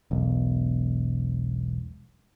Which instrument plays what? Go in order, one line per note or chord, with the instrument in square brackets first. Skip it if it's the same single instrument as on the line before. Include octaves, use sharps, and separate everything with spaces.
[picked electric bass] E1 B1